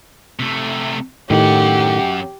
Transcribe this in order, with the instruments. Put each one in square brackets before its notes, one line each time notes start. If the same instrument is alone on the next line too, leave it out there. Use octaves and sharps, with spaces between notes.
[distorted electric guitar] C3 A3
[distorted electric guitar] F#2 F#5 [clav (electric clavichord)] A2 D#3 [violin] G4